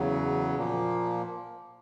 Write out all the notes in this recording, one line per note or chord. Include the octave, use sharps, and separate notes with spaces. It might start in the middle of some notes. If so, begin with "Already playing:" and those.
Already playing: E2 C#3 F#3
A#2 F3 A#3